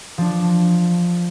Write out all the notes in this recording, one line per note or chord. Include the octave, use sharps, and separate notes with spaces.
F3 D4